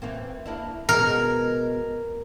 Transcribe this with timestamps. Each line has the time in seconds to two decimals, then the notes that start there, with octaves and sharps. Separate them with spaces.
0.02 E3 A#3 C4
0.46 A#3 D4 E4
0.89 B2 G#3 B3 A#4